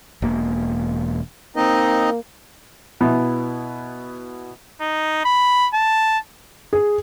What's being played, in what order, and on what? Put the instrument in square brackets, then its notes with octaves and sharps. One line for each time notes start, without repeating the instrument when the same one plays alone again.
[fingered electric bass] E1 A#3
[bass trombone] A#3 [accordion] C4 D#4 D#5
[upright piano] B2 B3 E4
[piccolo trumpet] D#4
B5
A5
[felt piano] G#4